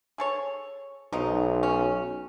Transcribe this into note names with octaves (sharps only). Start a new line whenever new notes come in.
G#4 A4 C#5
B1 F3 F#3 D#4
C#4